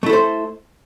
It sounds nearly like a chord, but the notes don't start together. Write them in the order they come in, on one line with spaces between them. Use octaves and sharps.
A3 E4 A4 C5